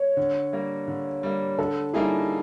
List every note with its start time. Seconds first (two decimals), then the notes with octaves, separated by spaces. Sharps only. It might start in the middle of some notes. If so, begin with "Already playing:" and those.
Already playing: C#5
0.17 D3
0.53 G3 A#3
0.88 D3
1.23 G3 A#3
1.58 D3 A4
1.93 G3 A#3 D#4 E4 G#4